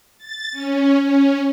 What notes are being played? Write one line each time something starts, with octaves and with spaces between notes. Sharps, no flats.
A6
C#4
C#4